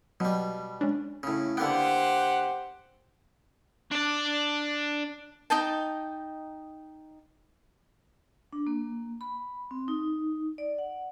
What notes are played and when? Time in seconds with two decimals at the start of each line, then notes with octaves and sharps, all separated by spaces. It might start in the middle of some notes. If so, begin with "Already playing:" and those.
0.20 B2 F#3 G3
0.81 G#3 C#4 D4
1.23 A2 C#3
1.57 D3 A#3 B3 G4 C5 F#5 G5
3.91 D4 D5
5.50 D#4 D#5 G5 A5
8.53 D4
8.67 A#3
9.21 B5
9.71 C4
9.88 D#4
10.58 D5
10.78 F#5